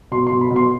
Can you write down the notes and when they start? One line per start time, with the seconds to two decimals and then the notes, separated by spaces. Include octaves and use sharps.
0.11 B2 C6
0.27 B2 C6
0.41 B5
0.50 B2
0.56 C6